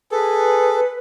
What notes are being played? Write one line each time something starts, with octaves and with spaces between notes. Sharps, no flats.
G#4 A4 B4